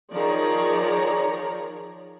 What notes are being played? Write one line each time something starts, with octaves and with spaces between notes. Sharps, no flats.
D#3 F3 G#4 C#5 D5 A#5